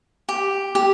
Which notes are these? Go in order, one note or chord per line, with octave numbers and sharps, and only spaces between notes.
G4
G4